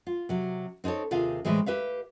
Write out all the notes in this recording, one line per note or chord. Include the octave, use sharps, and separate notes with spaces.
F4
C3 F#3
C4 D#4 G#4 A4 C#5
D#2 C3 F4 G#4 F5
A2 E3 G3 G#3 C4
G4 B4 E5 F5